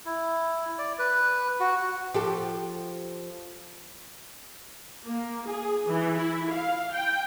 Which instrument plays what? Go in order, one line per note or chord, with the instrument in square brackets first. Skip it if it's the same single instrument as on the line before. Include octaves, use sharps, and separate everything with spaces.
[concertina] E4
D5
B4
F#4
[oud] F3 G4 A4
[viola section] A#3
G#4
E3
E4
F5
G5